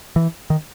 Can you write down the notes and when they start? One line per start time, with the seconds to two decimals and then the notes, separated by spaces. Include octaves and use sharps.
0.16 E3
0.50 D#3